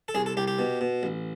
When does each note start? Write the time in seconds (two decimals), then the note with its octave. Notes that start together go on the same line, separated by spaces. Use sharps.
0.08 A4
0.15 C2 G#4
0.26 A4
0.37 C2 G4
0.48 G4
0.59 B2
0.81 B2
1.03 A1